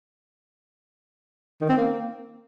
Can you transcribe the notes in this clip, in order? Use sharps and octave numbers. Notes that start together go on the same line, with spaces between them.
D#3
C4
A#3